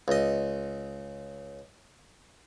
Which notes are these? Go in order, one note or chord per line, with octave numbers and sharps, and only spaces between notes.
C#2 D#5